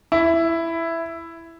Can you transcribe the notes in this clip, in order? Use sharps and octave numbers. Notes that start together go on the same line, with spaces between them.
E4